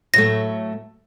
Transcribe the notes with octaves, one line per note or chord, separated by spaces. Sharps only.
A2 F#3 A3 A#6